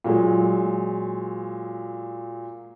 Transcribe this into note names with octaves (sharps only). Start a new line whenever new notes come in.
A#2 F#3 G#3